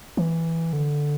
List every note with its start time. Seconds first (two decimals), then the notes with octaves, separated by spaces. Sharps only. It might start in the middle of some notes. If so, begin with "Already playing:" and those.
0.17 E3
0.73 D3